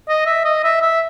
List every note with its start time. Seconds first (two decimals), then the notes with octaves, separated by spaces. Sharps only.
0.08 D#5
0.26 E5
0.45 D#5
0.64 E5
0.81 E5